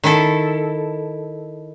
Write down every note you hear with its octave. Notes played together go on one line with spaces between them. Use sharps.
D#3 E4 A4